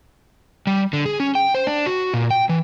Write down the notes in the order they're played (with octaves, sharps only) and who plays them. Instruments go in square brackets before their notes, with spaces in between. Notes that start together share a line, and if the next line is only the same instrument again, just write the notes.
[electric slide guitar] G3
D3
G#4
C#4
G5
C5
D4
F#4
A#2
G5
E3